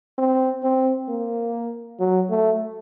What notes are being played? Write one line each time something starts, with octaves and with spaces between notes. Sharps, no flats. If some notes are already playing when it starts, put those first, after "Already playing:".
C4
C4
A#3
F#3
A3